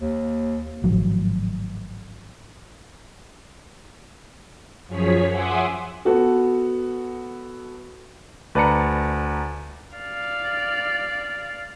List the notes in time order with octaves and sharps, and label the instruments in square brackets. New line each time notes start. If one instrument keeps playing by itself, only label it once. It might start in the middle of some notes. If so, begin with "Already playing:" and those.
[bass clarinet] D#2
[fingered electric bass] G#1 A2 F3 F#3
[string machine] F#2 F3 G#4 C#5 B6
E5 F#5 G#5 C6 D6 D#6
[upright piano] B3 F#4 A4
[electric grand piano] D2 B4 D5 A5 A#5 C#7
[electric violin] D5 F5